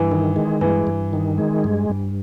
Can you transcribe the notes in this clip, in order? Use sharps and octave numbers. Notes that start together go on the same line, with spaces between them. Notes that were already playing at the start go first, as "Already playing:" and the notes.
Already playing: G2 E3
D#3
G#3
G2 E3
G2
D#3
G#3
G2
G2